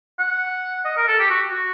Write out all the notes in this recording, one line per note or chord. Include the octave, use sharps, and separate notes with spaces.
F#5
D#5
A#4
A4
G4
F#4
F#4